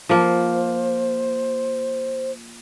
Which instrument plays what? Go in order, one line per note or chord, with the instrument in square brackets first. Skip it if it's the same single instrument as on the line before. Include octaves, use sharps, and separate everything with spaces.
[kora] F3 A#3 [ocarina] C5